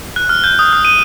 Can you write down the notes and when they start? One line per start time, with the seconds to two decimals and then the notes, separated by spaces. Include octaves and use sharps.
0.16 F#6
0.29 F6
0.44 G6
0.59 D#6
0.73 F6
0.85 D#7